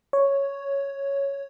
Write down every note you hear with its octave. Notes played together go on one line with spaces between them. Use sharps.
C#5